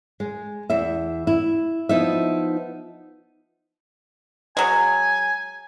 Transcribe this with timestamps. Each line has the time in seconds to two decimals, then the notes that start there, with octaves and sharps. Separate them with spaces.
0.20 G#3
0.70 E2 E4 E5
1.27 E4
1.89 F3 B3 D#4 E4 E5
4.57 F#3 G#3 G#5